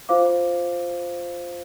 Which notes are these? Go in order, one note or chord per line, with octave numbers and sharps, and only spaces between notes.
F4 C5 F5 D6